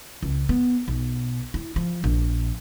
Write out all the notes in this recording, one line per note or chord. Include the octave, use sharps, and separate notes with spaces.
C#2
B3
B1
E4
F3
A#1